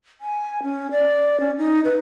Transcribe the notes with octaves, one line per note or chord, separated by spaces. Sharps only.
G#5
C#4
D5
C#4
D#4
B4